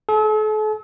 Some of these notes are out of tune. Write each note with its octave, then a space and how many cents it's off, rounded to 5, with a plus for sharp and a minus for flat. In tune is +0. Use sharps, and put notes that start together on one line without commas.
A4 -40 A5 -45